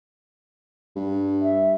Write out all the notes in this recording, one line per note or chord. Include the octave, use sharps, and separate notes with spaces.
G2
E5